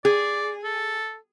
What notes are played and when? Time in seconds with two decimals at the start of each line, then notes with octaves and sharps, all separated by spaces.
0.05 G#4 D5
0.64 A4